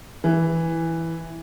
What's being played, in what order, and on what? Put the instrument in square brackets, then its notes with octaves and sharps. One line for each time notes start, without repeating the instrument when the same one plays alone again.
[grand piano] E3